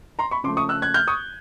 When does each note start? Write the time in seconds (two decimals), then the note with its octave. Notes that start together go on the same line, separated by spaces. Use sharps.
0.19 A#5 C6
0.31 B5 C#6
0.44 C#3 F3 A3 C6 D6
0.57 C#6 D#6
0.69 E6 F#6
0.82 F#6 G#6
0.94 F6 G6
1.08 C#6 D#6